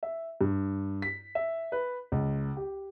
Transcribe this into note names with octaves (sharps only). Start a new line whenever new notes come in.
E5
G2
B6
E5
B4
C#2
G4